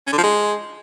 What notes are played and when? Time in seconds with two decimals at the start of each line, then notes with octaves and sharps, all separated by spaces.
0.07 C#4
0.12 D3
0.18 F3
0.23 G#3